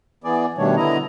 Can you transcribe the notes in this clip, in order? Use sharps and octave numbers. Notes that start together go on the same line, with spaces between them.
E3 B3 G#4 D5
B2 D#3 G3 A3 D4 C#5
D3 B3 E4 D#5 A#5